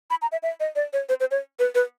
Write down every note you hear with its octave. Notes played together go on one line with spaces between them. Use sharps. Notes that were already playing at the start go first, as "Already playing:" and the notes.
B5
A#5
E5
E5
D#5
D5
C#5
C5
C5
C#5
B4
B4